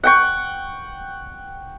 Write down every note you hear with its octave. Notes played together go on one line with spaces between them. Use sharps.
F#5 G5 C#6